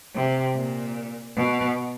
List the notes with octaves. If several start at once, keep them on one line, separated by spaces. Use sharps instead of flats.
C3
A#2
B2